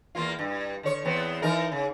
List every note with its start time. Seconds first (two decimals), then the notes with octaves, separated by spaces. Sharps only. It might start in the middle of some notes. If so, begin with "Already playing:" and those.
0.15 E2 A#3 F4
0.39 G2
0.83 D3 C#5
1.05 E2 B3 C4
1.42 E3 D#4 A#4
1.72 C#3